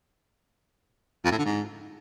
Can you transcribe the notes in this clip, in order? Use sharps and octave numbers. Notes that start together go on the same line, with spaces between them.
F2
A2
D3
G#2